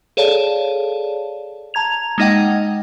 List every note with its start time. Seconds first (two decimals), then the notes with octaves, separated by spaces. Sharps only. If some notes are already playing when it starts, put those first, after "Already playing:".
0.17 G#4 A4 C#5 D5 F5 A5
1.74 A5 A#5 G#6 F7
2.18 G#3 A#3 D#4 D#5 F#5 G5